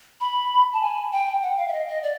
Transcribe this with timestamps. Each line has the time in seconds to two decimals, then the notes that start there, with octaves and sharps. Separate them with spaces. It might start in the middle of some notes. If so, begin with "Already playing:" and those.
0.21 B5
0.73 A5
0.81 G#5
1.12 G5
1.42 F#5
1.58 F5
1.68 E5
1.73 D#5
1.88 D#5
2.03 D5